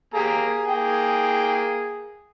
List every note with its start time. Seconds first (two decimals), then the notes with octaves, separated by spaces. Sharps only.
0.14 A#3 G4 G#4 A#5
0.67 A#3 G5